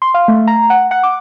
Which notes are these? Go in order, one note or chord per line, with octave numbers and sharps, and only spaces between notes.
C6
F5
A3
A#5
F#5
F#5
D6